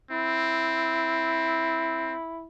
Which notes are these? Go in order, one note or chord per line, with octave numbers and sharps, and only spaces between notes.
C4 E4